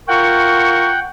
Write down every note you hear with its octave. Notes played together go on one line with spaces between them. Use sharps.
F4 A#4 F#5 G5 C#6